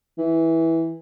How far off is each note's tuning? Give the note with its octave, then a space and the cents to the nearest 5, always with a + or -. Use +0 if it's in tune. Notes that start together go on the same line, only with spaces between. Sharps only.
E3 -10